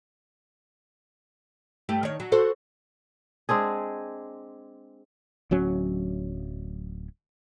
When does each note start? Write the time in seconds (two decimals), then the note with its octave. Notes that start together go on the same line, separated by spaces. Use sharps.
1.89 G2 A3 G4
2.03 D#3 C#5
2.20 F#3
2.32 F#4 A4 C5
3.49 G#3 C4 D4 G#4
5.51 D1 F#3 C#4